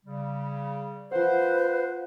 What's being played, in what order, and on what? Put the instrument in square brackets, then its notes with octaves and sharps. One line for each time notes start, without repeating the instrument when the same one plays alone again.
[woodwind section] C#3 G3
[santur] F3 F#5 [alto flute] B4 [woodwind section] C5